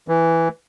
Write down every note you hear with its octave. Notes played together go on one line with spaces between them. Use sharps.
E3